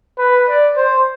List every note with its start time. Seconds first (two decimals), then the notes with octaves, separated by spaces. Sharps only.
0.18 B4
0.48 D5
0.76 C5